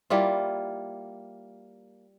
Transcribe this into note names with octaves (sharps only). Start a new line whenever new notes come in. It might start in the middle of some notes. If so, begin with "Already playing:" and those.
G3 A#3 E4 F4